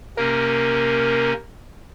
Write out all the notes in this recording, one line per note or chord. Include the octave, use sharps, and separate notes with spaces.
C3 A#3 C#4 A#4